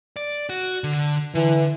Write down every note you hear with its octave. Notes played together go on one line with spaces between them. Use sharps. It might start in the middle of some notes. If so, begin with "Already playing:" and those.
D5
F#4
D3
D3 E3